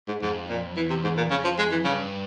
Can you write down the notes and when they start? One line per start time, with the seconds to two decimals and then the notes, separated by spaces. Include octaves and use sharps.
0.08 G#2
0.22 F2 G#2
0.49 A#2
0.76 E2 E3
0.90 C3
1.04 G#2
1.17 A#2
1.30 F2 C#3
1.44 F3
1.58 G#3
1.71 E3
1.84 G2 C#3